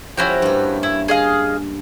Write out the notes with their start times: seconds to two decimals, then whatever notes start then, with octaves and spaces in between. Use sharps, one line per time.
0.17 F3 C#4 E4 F#4 G4
0.42 G2 A#3
0.83 E4
1.08 G#4 D#5 F5